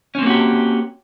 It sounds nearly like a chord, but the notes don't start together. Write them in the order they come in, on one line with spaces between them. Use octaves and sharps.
C#4 C4 A#3 F#4 G4